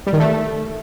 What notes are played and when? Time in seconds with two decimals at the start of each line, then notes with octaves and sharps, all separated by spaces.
0.07 G3
0.13 D#3
0.20 A3